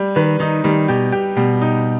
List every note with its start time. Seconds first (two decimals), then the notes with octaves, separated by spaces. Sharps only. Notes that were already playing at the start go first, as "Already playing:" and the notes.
Already playing: G3
0.16 D#3 B4
0.40 D#3 D#4
0.64 D#3 G3
0.88 B2 G4
1.12 G4
1.37 B2 G3
1.61 D#4